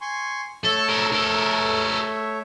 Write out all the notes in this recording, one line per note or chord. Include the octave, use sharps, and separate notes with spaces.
G#5 C6 C#6
A3 A4 C#5 E5
A4 A#4
A4 A#4